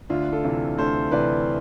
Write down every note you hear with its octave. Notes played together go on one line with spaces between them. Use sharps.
D2 D4 F4
F4 A4
C3 E3
D2 A4 C5
C3 E3 B4 D5